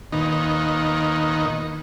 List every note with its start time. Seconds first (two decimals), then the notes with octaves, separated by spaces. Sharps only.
0.12 D#2 A#2 D#3 B3 D#4